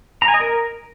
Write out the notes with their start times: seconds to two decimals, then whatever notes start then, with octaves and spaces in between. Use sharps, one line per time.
0.22 A#5
0.28 G#5
0.34 D#5
0.40 A#4